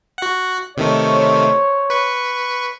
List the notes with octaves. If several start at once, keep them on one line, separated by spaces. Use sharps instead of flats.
F#4 F#5
C3 D#3 A3 C5 C#5
B4 C#6